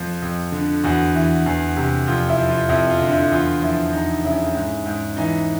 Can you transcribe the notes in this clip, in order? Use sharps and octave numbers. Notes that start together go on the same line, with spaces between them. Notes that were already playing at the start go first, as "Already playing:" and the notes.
Already playing: F2 F3
F2
D3
E2 F#4
E3
E2
C3
F2 F4
E4
F3
F4
F2 E4
F4
D3
E4
E2 F4
F3 E4
E2 D#4
C#3 E4
G#2
G#2
E3 D#4